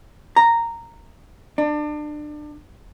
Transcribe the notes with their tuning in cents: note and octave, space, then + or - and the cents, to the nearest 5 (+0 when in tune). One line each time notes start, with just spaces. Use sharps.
A#5 -10
D4 +30